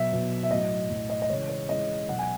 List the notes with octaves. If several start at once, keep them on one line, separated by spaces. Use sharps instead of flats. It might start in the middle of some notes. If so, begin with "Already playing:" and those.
Already playing: B2 F#3 E5
B2 F#3
E5
A2 F#3 D#5
A2 F#3
D#5
D#5
C#3 E3 G#3 C#5
C#5
C#3 E3 G#3 D#5
B2 F#3 F#5
G#5